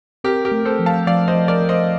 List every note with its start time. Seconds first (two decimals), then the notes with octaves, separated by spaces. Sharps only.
0.24 C4 G4 A#4
0.45 G4 A#4
0.52 A3
0.65 A4 C5
0.79 F3
0.86 F5 A5
1.07 F3 D5 F5
1.28 C5 D#5
1.34 F3
1.48 A#4 D5
1.62 F3
1.69 C5 D#5